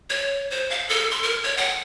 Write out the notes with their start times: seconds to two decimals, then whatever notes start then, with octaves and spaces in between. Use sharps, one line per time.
0.10 C#5
0.50 C5
0.70 F5
0.89 A4
1.11 C6
1.23 A#4
1.44 C#5
1.57 F#5